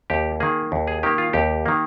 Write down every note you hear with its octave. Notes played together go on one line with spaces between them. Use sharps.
D#2 G4
D#3 A#3 G#4
D#2
G#4
D#3 A#3 G4
F4
D#2 G4
D#3 A#3